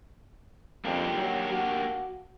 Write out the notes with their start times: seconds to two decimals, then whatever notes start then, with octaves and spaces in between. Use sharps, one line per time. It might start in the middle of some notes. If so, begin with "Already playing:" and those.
0.85 F2 A#3 D4 G4
1.17 F#3
1.51 F#4